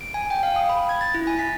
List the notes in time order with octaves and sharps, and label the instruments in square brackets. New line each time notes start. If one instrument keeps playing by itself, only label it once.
[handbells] D7
G#5
G5
F5
D#6
B5
G#6
A6
E4
G#5
B6